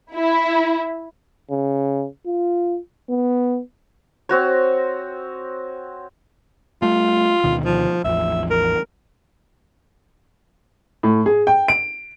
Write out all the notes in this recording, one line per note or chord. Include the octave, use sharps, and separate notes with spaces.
E4
C#3
F4
B3
C4 F#4 C#5
G3 A3 F4
D2 B2 D#3
F3
A1 E2 F3 E5
A#4
A2
G#4
G5
D7